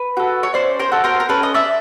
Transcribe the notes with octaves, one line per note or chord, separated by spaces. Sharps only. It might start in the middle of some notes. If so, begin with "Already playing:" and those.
Already playing: B4
F#4 A4
C#5
C#4 C5 D5
A#4 C5
F#4 A4
A#4 C5
A#4
C#4 A4 B4
D#5
D5 E5